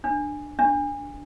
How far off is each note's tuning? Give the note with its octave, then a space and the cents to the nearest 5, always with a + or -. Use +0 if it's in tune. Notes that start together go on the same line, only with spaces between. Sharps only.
D4 +15
D4 -10